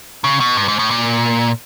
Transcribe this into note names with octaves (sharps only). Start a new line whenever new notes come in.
C#3
B2
G2
G#2
A2
A#2